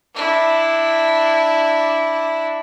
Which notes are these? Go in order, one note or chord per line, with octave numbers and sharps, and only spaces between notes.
D4 E4